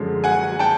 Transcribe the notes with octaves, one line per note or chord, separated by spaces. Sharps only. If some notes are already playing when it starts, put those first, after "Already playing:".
Already playing: F#2 D3 F3 G#3
F#5 G#5
G5 A5